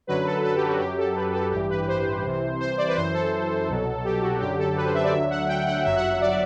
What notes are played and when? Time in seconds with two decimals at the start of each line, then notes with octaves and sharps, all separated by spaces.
0.07 F#2 D3 F#3 B4
0.26 A4
0.44 A4
0.55 G4
0.67 F#4
0.79 F#2 F#3 G4
0.98 A4
1.15 B4
1.33 A4
1.51 A1 G2 E3 G4
1.69 B4
1.88 C5
2.24 C2 C3 E3
2.60 C5
2.78 D5
2.88 B4
2.96 F#2 E3 C5
3.13 A4
3.68 C2 B2 F#3
4.04 G4
4.22 F#4
4.40 F#2 D3 F#3 G4
4.58 A4
4.76 B4
4.85 C5
4.94 E5
5.03 D5
5.12 D2 D3 F#3 E5
5.30 F#5
5.48 G5
5.67 F#5
5.85 G1 F#2 F#3 E5
5.96 F#5
6.09 F#5
6.21 D5